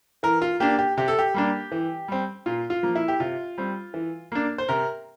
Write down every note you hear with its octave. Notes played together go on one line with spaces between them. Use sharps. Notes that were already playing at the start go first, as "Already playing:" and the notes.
E3 A#4
F4
A#3 D4 G4
G4
C3 G4
A4
G4
G3 A#3 D4
E3
G3 C4
A#2 F4
F4
F3 A#3
E4
G4
C3 F4
G3 C4
E3
A#3 D4
C5
C3 A#4